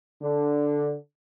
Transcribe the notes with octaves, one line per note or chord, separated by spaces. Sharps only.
D3